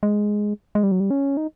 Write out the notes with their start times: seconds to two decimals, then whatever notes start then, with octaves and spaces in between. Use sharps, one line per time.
0.03 G#3
0.75 G#3
0.83 G3
0.92 F#3
1.00 G3
1.10 C#4
1.37 D#4